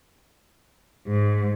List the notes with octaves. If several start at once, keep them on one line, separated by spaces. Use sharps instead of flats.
G#2